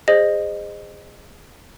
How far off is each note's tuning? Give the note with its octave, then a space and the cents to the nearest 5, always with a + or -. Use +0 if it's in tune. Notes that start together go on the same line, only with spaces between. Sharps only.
G#4 -25 C5 +0 D#5 -25